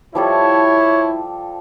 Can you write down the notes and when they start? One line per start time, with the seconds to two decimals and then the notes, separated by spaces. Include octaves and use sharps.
0.15 F3 G3 E4 A4 C#5